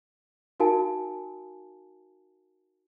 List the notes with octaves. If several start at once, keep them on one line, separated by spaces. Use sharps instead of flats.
D#4 F#4 A#4 F5 G#5 A5